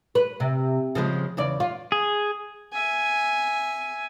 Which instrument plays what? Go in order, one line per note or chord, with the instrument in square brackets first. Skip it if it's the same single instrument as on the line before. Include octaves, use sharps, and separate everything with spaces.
[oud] B4
C3
C#3 F3 G#3
E2 C#3 D5
F4
[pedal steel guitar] G#4
[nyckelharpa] E5 G#5